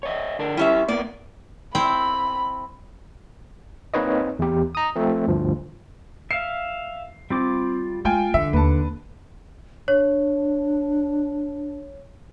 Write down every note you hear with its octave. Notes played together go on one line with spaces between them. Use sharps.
C#5 D#5 E5
D3 D4 A#4
G3 C#4 E4 G4 E5
A#3 B3 A#4 D5
C4 E4 G5 B5
A#3 C4 D#4 B4 C#5 D#5
E2 G4
A#5 D#6
F3 A3 C4
D2 G2 F3
E5 F5 C7
G3 C4 F4 D6
G#3 F4 G5 G#5
D3 E3 E5
D#2 B4 A5
D4 C#5